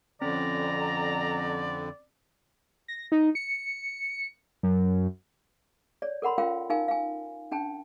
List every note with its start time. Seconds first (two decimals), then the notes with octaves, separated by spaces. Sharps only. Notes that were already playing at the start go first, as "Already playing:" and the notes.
0.21 F2 D3 C4 C#4 D5 A#5
2.88 A#6
3.12 D#4
3.35 C#7
4.63 F#2
6.02 C#5 D5
6.22 A4 A#4 F#5 B5 C6
6.38 C#4 F4 A#4 F5 G5
6.70 D#4 A#4 F5 G#5
6.88 F5 G#5
7.52 C#4 D4 G5 A5